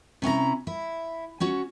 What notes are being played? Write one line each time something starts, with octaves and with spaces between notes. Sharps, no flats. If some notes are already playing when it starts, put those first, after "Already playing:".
C3 C#4 E4 A#5
E4
C#4 F#4 C#5